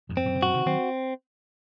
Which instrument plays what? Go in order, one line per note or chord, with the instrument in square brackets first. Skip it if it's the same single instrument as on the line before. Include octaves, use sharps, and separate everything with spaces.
[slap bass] F2 G#2
[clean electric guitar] C4
[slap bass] F#2 A#2
C3
[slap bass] F#2 A#2 [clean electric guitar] F#4
[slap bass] C3 D#3
[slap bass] D#3 F#3 [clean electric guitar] C4